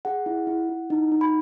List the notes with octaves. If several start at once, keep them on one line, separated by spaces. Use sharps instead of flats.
G#4 F#5
E4
E4
E4
D#4
D#4
B5